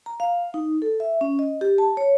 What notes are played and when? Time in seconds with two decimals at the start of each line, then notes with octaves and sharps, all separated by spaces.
0.06 A#5
0.20 F5
0.54 D#4
0.82 A4
1.00 E5
1.21 C#4
1.39 D#5
1.61 G4
1.78 A5
1.97 C#5